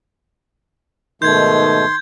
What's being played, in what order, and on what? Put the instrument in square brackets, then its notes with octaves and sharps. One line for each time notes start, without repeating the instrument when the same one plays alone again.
[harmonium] G#2 B2 A3 [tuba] D#3 [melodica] C6 [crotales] G6 G#6